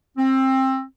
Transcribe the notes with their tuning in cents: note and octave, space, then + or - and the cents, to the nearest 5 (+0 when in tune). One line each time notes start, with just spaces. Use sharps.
C4 +20